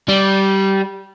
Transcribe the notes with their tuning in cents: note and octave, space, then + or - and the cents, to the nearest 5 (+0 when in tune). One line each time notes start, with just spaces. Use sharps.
G3 -15